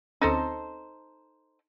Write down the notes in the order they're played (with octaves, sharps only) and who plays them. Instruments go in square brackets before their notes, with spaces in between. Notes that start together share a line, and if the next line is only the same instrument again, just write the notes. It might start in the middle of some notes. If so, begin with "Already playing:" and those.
[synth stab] D2 C4 C#4 [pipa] D#4 A4 C5